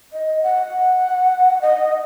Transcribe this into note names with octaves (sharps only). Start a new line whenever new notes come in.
D#5
F#5
D#5